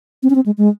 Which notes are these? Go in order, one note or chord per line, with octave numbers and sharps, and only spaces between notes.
C4
C#4
C4
G#3
G#3